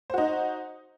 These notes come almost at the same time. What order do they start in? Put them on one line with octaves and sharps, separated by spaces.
C5 F#4 D#4